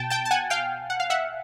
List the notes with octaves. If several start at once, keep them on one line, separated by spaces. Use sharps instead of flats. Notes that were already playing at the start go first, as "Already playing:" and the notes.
Already playing: B2 G5 A5
G5 A5
A5
F#5 G#5
F5 G5
F#5
F5
E5 F#5